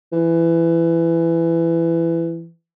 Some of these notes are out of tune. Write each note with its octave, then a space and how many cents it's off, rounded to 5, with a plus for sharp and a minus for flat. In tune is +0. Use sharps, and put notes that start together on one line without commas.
E3 +15